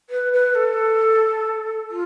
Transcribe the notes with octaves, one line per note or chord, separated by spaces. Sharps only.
B4
B4
A4
F4